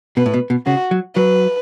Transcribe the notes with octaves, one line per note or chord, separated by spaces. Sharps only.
B2 B4
A2
B2
B2
C#3 F#4
F#3
F#3 B4